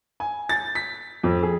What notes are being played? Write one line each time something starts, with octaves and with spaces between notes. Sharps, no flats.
G#5
A6
B6
F2
G#4